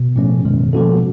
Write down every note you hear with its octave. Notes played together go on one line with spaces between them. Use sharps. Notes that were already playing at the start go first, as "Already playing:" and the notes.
Already playing: B2
A2 F3 A3 C#4
F#2 B2 D#3 G#3
F3 A#3 C#4 F#4 A4